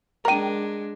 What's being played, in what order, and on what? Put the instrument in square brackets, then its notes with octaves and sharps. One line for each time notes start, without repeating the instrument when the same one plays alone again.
[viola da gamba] G#3 D4 [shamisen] A#4 G5 [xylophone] A#5 D#7